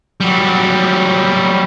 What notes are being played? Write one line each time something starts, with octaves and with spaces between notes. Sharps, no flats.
F#3 G3